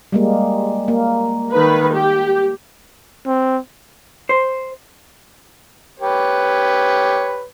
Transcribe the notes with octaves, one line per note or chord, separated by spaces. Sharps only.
G3 G#3 A#3
A#3
D#3 B4
G4
C4
C5
G4 B4 C#5